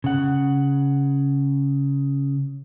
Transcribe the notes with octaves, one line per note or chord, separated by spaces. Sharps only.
C#3 F#5